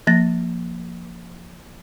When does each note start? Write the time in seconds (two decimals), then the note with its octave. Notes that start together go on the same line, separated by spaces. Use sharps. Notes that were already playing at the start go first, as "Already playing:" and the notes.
0.07 F3 A#3 A6 A#6